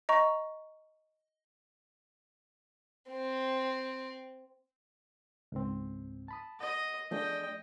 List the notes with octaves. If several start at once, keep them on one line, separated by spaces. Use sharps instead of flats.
D#5 A#5 C#6
C4
C#2 G#2 C4
A5 B5 D#6
D#5 F#5
E2 F3 A3 D4 G#4 D#5 G5